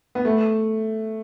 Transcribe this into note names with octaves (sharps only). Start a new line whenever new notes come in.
B3
A3